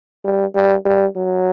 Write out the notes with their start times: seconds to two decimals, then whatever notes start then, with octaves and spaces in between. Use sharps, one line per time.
0.24 G3
0.55 G3
0.85 G3
1.16 F#3